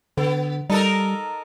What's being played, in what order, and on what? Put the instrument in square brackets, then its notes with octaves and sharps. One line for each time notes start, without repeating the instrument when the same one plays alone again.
[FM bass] D3 [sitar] B3
[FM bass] G3 [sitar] D#4 A4 A#4